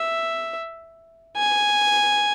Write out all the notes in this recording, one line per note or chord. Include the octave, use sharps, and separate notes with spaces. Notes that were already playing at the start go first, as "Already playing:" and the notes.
Already playing: E5
G#5